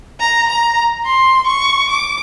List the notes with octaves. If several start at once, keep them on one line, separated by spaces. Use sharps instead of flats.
A#5
A#5
C6
C#6
D6